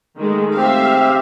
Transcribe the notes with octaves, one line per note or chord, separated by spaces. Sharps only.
D#3 G#3 A3
C4 G4 E5 F5